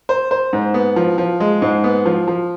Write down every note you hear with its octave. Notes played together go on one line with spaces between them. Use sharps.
C5
C5
G#2
B3
F3
F3
G#3
G#2
B3
F3
F3